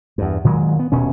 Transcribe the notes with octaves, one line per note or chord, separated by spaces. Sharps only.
E2 G2
A#2 D#3 F#3 G#3
B3
D#1 B2 C#4